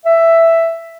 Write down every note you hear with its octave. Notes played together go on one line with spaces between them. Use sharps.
E5